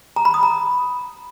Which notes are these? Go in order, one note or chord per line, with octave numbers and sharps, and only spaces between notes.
A#5
B5
D#6
A#5